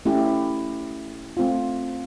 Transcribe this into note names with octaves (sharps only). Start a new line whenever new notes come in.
A3 C#4 E4 G4
A3 C4 F4